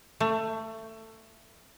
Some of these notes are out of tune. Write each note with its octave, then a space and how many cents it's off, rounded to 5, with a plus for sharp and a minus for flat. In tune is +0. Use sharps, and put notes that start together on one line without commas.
A3 +20